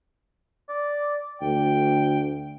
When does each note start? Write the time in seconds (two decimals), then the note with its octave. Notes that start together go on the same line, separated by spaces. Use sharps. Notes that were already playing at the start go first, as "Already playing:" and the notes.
0.69 D5
1.41 D2 G5